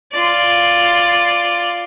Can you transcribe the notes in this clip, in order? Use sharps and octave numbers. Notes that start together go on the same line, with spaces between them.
F4 D5